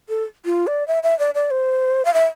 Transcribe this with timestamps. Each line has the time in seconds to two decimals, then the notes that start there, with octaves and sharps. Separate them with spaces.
0.09 A4
0.45 F4
0.67 D5
0.88 E5
1.03 E5
1.19 D5
1.35 D5
1.51 C5
2.05 F5
2.14 E5